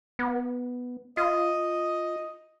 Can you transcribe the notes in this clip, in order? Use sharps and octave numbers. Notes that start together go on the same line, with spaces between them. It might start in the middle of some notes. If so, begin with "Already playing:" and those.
B3
F4 D#5